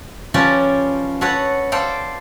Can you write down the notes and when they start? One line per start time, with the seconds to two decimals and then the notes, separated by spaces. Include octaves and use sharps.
0.34 F3 C#4 F4 G4 B4 D5
1.21 F#4 A4 B4 C#5 F#5
1.72 A4 C5 D5 F5 G5